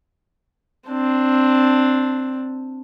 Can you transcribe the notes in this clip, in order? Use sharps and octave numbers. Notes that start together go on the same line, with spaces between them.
C4 D4